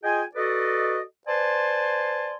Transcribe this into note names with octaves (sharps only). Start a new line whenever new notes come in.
F4 G#4 D#5 G5 G#5
F#4 A4 B4 D5 D#5
B4 C5 D5 G#5 A5 C6